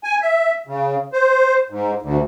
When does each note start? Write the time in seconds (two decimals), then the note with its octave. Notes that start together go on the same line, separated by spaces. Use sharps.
0.04 G#5
0.22 E5
0.67 C#3
1.13 C5
1.70 G#2
2.02 D2